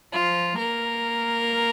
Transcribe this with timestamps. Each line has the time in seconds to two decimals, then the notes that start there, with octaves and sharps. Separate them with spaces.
0.14 F3 F4
0.59 A#3 A#4